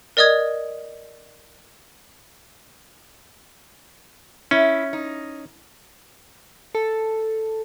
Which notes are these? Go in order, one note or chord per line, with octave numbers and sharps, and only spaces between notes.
A#4 D5 D#5 D#6 G#6
C#4 E4
D#4
A4